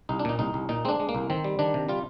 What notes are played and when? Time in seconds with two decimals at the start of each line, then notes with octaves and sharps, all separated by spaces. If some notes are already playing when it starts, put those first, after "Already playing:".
0.09 C2 D#4
0.19 D4
0.25 A#2 D#4
0.39 C2 D#4
0.54 C2
0.69 A#2 D#4
0.85 G#3 C4
0.89 D4
1.00 G#3
1.09 A#3
1.15 C2
1.30 D#3 C4
1.44 G3
1.59 D#3 D4
1.74 C3
1.89 G3 F4